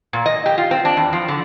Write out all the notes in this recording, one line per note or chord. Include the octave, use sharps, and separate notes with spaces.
A#2
D#5
G4
F4
C4
D4
E2
F3
D3